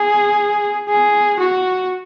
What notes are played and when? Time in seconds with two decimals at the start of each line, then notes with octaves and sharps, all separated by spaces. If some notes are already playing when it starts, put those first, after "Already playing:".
Already playing: G#4
0.88 G#4
1.40 F#4